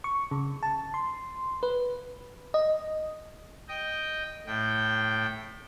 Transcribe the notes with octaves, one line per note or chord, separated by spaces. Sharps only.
C#6
C#3
A5
C6
B4
D#5
D#5 G5
A2 G5